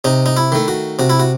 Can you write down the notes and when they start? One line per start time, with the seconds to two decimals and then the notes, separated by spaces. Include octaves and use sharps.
0.04 C3 D#4
0.26 D#4
0.37 E4
0.52 D#3 A3
0.68 F#4
0.99 C3 F#4
1.10 E4
1.20 F#4